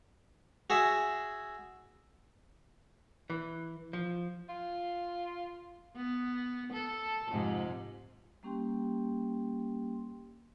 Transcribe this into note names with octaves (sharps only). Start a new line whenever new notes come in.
F#4 G#4 E5
E3
F3
F4
B3
A4
F2 G#2 C3
G3 A#3 C#4 G4 G5 C6